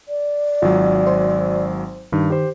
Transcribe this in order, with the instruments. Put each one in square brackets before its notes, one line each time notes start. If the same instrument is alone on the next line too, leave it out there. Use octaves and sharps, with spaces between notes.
[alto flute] D5
[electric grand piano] G#1 F#3 [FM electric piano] F4
[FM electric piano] C5
[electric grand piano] G2 [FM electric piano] D#3
[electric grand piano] G4 C5